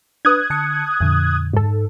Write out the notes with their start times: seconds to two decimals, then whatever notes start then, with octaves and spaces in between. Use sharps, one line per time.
0.25 D4 B4 D#6 F#6 G#6
0.50 D3 A5 C#7
1.01 F2 A#2 D3
1.53 G#2 A4